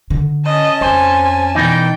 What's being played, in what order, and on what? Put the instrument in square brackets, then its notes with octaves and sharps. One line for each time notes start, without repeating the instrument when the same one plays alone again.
[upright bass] D3
[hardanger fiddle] C#4 A5 [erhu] D#5
[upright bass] F2 [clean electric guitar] C5 [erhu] G#5
[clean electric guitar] B2 E3 D#4 [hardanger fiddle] D5 G5